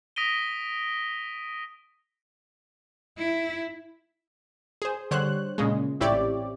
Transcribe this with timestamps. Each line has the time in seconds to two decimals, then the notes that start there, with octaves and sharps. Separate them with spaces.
0.16 D#6 A#6 B6 D7 D#7 G7
3.18 E4
4.82 G#4 C5
5.11 D3 G3 C5 C#5 F#6
5.58 A#2 C#3 G#3
6.00 A1 C4 E4 G4 C#5 D5